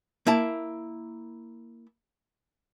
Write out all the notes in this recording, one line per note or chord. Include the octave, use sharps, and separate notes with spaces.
A#3 E4 A5